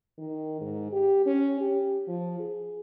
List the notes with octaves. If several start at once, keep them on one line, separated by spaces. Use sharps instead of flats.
D#3
G#2
G4
C#4
G4
F3
G#4